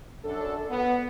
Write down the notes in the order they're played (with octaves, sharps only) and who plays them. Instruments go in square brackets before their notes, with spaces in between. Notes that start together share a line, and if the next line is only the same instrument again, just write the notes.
[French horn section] F#2 D4 A4
B3